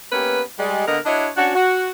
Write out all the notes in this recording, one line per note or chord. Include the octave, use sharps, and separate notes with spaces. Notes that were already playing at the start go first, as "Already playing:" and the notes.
A#3 B3 C#4 G4 B4
G3 G#3
D3 A#3 B3 A#4 D#5
D4 E4 F#4 C#5 D#5
C#4 D4 F#4
F#4